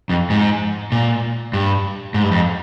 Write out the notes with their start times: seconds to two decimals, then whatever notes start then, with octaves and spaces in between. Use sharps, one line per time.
0.09 F2
0.30 G#2
0.92 A#2
1.53 G2
2.14 G#2
2.23 G2
2.31 F2